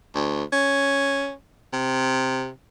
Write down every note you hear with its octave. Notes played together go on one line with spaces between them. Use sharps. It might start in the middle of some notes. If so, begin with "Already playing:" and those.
D2
C#4
C3